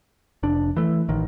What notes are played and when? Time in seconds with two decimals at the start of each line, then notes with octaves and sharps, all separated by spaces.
0.43 F1 D4
0.77 E3 A3
1.09 A1 D#3